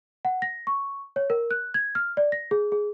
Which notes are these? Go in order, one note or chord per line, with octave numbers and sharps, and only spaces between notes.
F#5
A#6
C#6
C#5
A#4
F#6
G#6
F6
D5
A#6
G#4
G#4